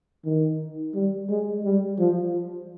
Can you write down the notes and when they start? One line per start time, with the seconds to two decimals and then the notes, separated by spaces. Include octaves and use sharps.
0.25 D#3
0.94 G3
1.29 G#3
1.64 G3
1.99 F3